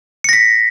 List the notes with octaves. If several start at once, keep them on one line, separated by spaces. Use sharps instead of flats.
A#6 B6 C#7